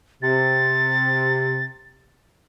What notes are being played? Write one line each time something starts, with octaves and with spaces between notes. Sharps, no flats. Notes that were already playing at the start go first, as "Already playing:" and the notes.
C3 A6